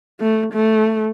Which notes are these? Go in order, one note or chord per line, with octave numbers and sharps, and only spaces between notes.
A3
A3